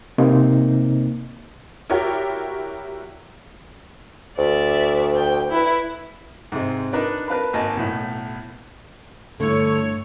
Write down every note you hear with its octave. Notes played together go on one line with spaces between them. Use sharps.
C3 A#3 C4 D#4
E4 F#4 G4 A#4 C#5 D5
D2 D5 E5
G5
E4 B4
G#2 C3 G#3
D4 D#4 A#4 B4 D5
A#4 B4 F5 A5 B5
G#1 A#3 D#5 G#5 A5
B1 A2
G2 D3 A3 E4 A4 C#5